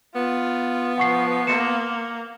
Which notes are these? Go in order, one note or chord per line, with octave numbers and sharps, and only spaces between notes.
B3 F4
F3 F#5 C#6 C7
A#3 C6 C#7 E7